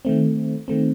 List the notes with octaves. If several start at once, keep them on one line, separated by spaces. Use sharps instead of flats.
D#3 A3 C4
D#3 A3 C4